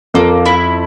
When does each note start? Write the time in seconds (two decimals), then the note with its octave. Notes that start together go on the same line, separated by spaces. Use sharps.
0.14 F2 A#3
0.46 E4